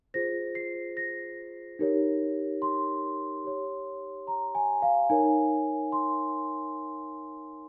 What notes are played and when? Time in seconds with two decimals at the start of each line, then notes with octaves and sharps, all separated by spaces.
0.14 F4 G#4 C5 A#6
0.55 C7
0.97 A#6
1.79 D#4 G4 A#4 C#5
2.62 C6
3.44 G4 C#5
4.27 A#5
4.55 G#5
4.82 F5
5.10 D#4 A#4 C#5 G#5
5.92 C6